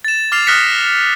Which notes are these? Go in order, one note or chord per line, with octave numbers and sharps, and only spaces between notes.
A6 E7
D6 F6 A6 C7 F7
D#6 F6 F#6 A#6 B6 C#7